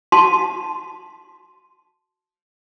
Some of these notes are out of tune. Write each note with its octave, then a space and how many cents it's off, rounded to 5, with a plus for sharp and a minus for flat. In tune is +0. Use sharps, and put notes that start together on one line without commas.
F#4 +0 A5 +0 C6 +0